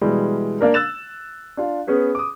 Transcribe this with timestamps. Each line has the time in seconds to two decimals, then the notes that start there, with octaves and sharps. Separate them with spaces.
0.01 B2 E3 G3 G#3
0.61 A#3 D4 A#4
0.74 E6 F#6 A6 E7
1.57 D4 F4
1.87 B3 C#4 G#4 B4
2.15 D6 D#6